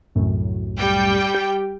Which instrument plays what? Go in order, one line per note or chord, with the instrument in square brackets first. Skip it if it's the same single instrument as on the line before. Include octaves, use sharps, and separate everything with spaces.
[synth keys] C2 F#2 A2
[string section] G3 G5
[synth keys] G4